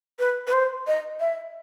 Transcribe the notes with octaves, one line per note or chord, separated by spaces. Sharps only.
B4
B4
C5
D#5
E5